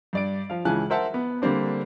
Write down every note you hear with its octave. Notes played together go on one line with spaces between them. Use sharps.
G2 D5 D7
F3 F5
C#2 C#3 E3 G#5 A5 F#6
A#4 C5 E5 F#5 A5
B3
D3 G3 A#3 C4 D4